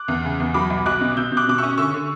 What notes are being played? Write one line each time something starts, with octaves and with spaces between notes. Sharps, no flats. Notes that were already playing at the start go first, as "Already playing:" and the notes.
Already playing: D6 F#6
E2
C#3
E2
F#3 B5 D6
B1
B1 D6 F#6
B2
B2 E6 G6
B2
D6 F#6
B2 D6
C#6 E6
C#4
D3 C#6 E6
D3